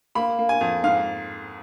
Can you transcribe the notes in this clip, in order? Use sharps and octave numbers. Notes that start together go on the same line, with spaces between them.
A#3 B5
A#3
G#5
F2
G#2 F5